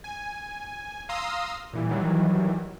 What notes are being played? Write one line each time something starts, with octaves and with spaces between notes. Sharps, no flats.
G#5
F5 A#5 C6 D#6 E6
A#2 E3 G3
D#3 E3 F#3 G3